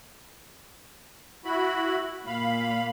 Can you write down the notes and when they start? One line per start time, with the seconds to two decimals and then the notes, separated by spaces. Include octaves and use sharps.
1.45 E4 F#4 B5
2.27 A#2 F5 B5